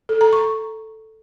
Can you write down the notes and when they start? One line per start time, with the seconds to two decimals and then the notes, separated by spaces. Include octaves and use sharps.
0.09 A4
0.21 A#5
0.33 C#6